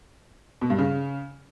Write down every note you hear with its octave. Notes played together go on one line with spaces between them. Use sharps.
B2
G2
C#3